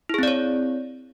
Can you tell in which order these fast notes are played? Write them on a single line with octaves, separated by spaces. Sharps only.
E4 G#4 C4 D5 C#5